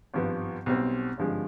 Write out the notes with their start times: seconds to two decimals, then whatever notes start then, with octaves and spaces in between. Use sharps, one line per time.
0.14 G#1 G2 F3 B3
0.66 B1 B2 G3 C4
1.18 G#1 G2 D3 F3 G#3